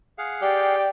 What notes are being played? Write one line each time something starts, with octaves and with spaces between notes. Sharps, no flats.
G#4 F5 F#5
G4 D5 G5